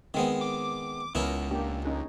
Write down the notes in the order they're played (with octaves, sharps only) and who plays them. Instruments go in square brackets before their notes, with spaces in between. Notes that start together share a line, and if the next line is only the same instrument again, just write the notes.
[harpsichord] D#3 G#3 B3 [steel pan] C4
[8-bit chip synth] D6
[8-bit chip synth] C#2 [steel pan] B3 A#4 [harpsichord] C#4 D#4 E4
[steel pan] A#3 D4 G4
C#4 D#4 G#4